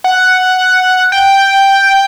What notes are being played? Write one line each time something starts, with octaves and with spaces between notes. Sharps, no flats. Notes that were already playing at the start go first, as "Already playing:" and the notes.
F#5
G5